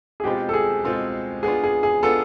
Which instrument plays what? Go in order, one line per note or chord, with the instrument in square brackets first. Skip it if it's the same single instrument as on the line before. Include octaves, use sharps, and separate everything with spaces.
[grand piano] G#4
[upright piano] B2 G#3 C4 F4 [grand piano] G4
[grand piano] A4
G#4
[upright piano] B2 G#3 C4 F4 [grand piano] A4
[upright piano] B3 D4 F4 [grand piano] G#4
[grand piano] G#4
G#4
[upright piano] B3 D4 F4 [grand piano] A4